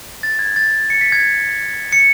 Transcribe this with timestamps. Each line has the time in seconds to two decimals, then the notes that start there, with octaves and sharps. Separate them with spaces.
0.23 A6
0.39 G#6
0.56 A6
0.90 C#7
1.01 B6
1.12 G#6
1.93 C#7